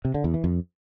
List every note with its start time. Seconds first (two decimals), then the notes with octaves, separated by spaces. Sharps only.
0.05 C3
0.14 D3
0.24 E2
0.34 E3
0.44 F2